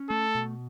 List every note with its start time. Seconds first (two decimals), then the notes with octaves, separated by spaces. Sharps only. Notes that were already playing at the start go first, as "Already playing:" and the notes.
Already playing: C#4
0.10 A3 A4
0.35 B2